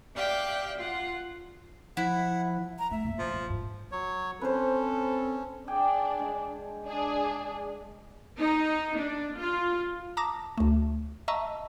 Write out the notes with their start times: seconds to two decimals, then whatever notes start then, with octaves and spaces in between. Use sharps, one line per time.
0.16 G4 D5 E5 F5 G5 F#6
0.77 F4 F#5
1.97 F3 E4 F#5
2.79 A#5
2.91 A3 E5
3.04 A#1 F#2
3.19 F3
3.33 A#2
3.50 G#2
3.92 F#3 C#5
4.41 C4 C#4 A4 B4 C5
5.68 D4 G#4 D5 G5
6.19 G#3
6.87 D4 G#4
8.40 D#4
8.98 D4
9.38 F4
10.17 A5 A#5 D6 D#6 A#6
10.58 D2 A3
11.28 D#5 E5 A5 A#5 C#6 E6